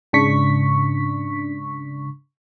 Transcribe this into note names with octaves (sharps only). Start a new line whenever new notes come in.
G#2 C#3 D4 C#6 B6